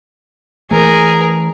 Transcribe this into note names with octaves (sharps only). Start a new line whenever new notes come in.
E3 A3 G#4 A#4